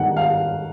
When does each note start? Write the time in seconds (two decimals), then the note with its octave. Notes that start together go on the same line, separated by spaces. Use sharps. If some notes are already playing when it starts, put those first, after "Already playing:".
Already playing: G2 D#3 G#3 F#5
0.17 F5